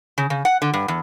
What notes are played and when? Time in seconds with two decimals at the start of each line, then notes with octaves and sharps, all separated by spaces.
0.18 C#3
0.30 C#3
0.45 F#5
0.62 D3
0.74 G2
0.88 E2